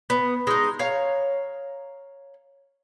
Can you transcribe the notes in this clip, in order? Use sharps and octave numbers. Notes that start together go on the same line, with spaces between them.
B3
G#3 D#4
C#5 F5 A#5